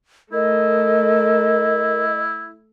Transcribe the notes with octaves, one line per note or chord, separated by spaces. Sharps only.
A3 E4 A#4 D#5